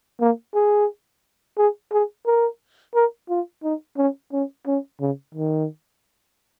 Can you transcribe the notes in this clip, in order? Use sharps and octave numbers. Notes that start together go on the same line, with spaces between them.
A#3
G#4
G#4
G#4
A#4
A#4
F4
D#4
C#4
C#4
C#4
C#3
D#3